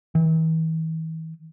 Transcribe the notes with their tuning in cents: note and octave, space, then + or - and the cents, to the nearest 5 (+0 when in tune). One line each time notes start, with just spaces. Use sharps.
E3 -40